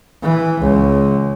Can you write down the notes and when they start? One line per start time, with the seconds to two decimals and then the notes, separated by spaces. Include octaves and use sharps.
0.23 E3
0.61 C#2